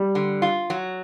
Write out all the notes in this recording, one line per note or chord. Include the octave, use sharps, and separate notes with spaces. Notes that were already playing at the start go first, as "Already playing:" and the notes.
Already playing: G3
D3
F4
F#3